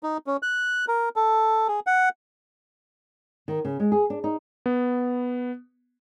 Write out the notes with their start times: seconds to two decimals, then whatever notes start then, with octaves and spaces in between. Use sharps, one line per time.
0.03 D#4
0.27 C#4
0.43 F#6
0.88 A#4
1.16 A4
1.68 G#4
1.87 F#5
3.48 D#3
3.65 C#3
3.80 G#3
3.92 G#4
4.10 D4
4.24 D#4
4.66 B3